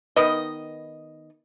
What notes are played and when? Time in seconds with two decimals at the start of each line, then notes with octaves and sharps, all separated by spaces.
0.16 D#3 B3 D#5